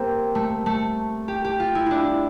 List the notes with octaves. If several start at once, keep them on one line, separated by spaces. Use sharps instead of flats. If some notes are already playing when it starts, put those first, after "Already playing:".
Already playing: A#3 C4 G4
A3
A3
G4
G4
F4
E4
D4 E4